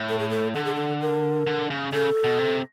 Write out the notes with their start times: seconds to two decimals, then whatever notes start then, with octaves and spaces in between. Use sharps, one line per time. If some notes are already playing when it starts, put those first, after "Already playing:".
Already playing: A2
0.09 A4
0.19 G#4
0.30 A4
0.54 D3 A4
0.65 G#4
0.75 A4
1.01 A#4
1.47 D3
1.70 C#3
1.93 C#3 A4
2.24 B2
2.39 C3